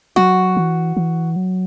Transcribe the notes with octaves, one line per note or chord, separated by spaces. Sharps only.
F#3 F#4
E3
E3
F#3